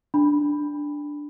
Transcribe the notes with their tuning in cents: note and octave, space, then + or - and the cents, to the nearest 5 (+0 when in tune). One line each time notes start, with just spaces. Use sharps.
D4 +0 B5 +0